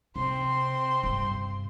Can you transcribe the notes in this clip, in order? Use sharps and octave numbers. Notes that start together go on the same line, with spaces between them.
C3 C4 C6
G2 C3